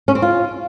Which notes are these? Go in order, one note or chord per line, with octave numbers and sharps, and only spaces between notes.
C#4
C4
F4